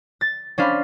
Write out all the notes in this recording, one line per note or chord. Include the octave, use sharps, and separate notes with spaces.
A6
C#4 D4 C5 F5 B5